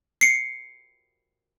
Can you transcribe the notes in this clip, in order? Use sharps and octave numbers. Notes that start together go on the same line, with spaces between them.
C7 C#7